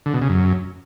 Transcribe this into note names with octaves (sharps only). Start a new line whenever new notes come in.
D3
B2
C#3
F#2